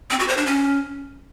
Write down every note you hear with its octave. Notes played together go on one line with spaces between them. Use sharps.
C4
F#4
C5
D4
C#4